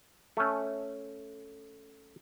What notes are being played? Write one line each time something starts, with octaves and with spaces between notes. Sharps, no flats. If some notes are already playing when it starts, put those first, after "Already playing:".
A3 C#4